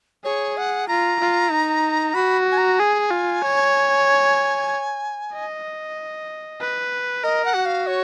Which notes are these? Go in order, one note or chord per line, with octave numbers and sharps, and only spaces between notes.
G#4 C#5
F#5
F4 A#5
F4
D#4
F#4 B5
G#5
A#5
G#4 G#5
F4
C#5
D#5
B4
A#4 D#5
F#5
F#4
F5
C#5